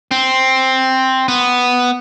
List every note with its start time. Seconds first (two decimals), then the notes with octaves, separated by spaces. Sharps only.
0.11 C4
1.28 B3